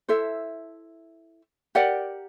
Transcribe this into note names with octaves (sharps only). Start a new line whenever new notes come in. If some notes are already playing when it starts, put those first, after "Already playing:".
E4 A4 C5 E5
G4 A#4 D5 F#5